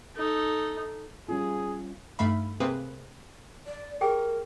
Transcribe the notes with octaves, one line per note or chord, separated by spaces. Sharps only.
D#4 A4
G3 C#4 F4 G#4
G2 A3 D#4 E5 F5 B5
C3 A#3 C4 G#4 B4 C5
D5
G4 G#4 A#4 G5